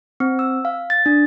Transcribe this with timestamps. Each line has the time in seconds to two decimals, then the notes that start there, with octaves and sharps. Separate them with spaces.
0.20 C4
0.39 E6
0.65 F5
0.90 A6
1.06 D4